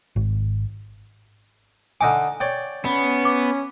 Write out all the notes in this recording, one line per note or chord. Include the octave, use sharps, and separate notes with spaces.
G#1
D3 D#4 G#5 D6
C#5 D5 G5
B3 C#4
D6